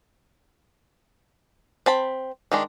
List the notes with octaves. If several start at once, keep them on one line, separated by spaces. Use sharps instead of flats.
C4 A5 B5
D#3 G#3 D4